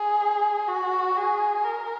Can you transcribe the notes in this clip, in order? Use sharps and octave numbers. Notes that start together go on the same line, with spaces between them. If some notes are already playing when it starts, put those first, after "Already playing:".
Already playing: G#4
F#4
G#4
A#4